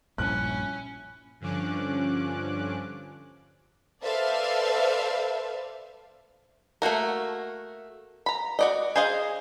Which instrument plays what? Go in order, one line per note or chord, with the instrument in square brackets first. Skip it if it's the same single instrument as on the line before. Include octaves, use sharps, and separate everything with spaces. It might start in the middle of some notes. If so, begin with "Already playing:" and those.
[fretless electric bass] A#1 G2 A#2 [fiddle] C#4 E4 [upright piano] F#6
[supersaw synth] G2 D3 F3 C#4 D6 F#6
[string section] A4 B4 C5 D5 E5 F5
[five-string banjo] A3 A#3 F#4 A#4
A#5 B5
F#4 D5 D#5
G#4 C5 D#5 F5